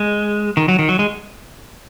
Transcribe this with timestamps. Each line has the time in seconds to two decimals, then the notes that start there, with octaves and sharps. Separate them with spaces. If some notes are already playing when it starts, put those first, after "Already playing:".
Already playing: G#3
0.57 D#3
0.68 F#3
0.79 D#3
0.89 F#3
0.99 G#3